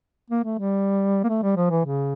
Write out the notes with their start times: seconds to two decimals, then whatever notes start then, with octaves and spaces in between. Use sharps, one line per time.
0.30 A#3
0.44 A3
0.59 G3
1.24 A#3
1.29 A3
1.43 G3
1.57 F3
1.70 E3
1.85 C#3